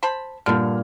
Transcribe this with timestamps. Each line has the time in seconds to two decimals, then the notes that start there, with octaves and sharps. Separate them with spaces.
0.03 C5 A5 B5
0.46 G2 A#2 D3 G3 F6